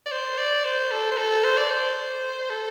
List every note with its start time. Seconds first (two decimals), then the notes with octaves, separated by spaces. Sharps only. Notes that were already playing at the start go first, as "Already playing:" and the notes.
0.06 D5
0.12 C5
0.38 D5
0.64 C5
0.91 A4
1.11 C5
1.17 A4
1.44 C5
1.57 D5
1.71 C5
2.50 A4